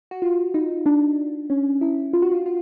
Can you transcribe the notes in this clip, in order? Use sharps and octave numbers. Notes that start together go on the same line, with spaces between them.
F#4
F4
D#4
D4
C#4
E4
F4
F#4
F4
F4